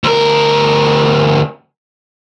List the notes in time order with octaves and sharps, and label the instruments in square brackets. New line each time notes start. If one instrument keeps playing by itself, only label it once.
[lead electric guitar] D2 A#4